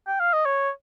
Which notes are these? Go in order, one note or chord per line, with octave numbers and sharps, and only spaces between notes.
G5
F5
D#5
C#5